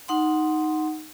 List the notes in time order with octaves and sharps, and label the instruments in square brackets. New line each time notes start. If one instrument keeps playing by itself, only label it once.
[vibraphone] D#4 F#5 C6